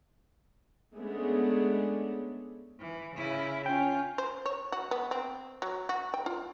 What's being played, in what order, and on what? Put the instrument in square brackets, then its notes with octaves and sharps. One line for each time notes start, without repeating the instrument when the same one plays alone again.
[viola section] G#3 A3 B3 C#4 D4 G#4
[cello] E3
C#3 E4
[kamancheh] C#4 [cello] F4 [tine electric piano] G5
[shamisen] C5
C#5
F#4
B3
C4
F#3
F#4
G5
F4